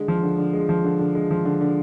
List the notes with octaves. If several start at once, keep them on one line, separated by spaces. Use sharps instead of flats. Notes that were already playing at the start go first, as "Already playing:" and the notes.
Already playing: D3 G#3
F3
D3
D3
G#3
F3
D3
D3
G#3
F3
D3
D3